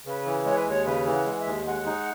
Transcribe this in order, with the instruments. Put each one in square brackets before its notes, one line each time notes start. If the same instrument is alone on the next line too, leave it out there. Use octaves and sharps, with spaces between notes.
[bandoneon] C#3 [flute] B4
[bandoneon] E3
[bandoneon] G#3 [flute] C#5
[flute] B4
[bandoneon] D#2 [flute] C#5
[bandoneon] C#3 [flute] B4
[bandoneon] E3
[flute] F#5
[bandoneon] G#3
[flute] E5
[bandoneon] D#2
[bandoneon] G#3 [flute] F#5
[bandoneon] D#4